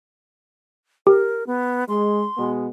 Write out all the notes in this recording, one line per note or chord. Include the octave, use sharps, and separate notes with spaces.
G4 A#4
B3
G#3 C6
B2 G#3 B3